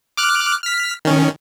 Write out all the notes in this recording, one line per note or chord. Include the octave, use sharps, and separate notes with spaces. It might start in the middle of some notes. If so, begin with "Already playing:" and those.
D6 F6 F#6
F6 B6
D#3 C#4